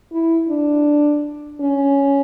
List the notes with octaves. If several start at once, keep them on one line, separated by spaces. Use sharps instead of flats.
E4
D4
C#4